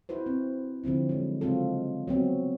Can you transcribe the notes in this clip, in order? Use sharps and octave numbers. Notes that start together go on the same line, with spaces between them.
E4 F#4 B4 C5
C4
D3 F3 C4 E4
F#3 G#3
C#3 F#3 G#3 C4 F4 A4
F#3 B3 C4 F#4